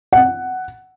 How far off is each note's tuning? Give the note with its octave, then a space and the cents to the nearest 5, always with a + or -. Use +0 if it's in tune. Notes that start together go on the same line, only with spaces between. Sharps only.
F#5 +10